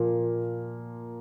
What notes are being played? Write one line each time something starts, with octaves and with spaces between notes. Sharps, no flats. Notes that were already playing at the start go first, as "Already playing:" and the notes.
Already playing: A#2 F3 A#3